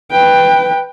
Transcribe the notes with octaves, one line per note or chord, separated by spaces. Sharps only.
B4 G5